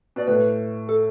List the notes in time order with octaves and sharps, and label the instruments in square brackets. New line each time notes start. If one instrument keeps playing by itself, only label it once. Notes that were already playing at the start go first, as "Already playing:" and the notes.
[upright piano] B2 [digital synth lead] D5
[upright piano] A2 [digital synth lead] B4
[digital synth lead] A4